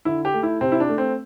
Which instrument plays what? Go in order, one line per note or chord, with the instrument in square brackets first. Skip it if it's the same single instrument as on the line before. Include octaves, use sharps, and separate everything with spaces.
[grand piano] D3 E4
G4
A3
E4
C3 C4
E4
D4
A3
C4